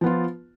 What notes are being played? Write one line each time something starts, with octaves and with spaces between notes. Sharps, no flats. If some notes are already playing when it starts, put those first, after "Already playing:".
F3 B3 F4